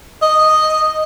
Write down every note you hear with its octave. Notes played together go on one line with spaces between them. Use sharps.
D#5